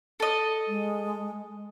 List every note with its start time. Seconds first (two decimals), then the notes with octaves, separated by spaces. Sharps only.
0.20 A4 D#5
0.68 G#3